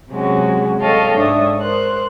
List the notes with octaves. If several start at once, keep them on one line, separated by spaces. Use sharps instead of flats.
C3 F#3 G#3 C#4 F#4
A4 C#5 D#5 F5 G5 A5
G#2 D4 C#5 E5 D#6
A#4 C5 F#6